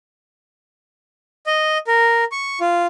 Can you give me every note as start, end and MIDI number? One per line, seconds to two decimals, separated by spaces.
1.46 1.78 75
1.87 2.24 70
2.32 2.59 85
2.61 2.87 65